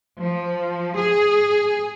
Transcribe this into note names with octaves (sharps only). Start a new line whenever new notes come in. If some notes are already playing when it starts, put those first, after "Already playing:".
F3
G#4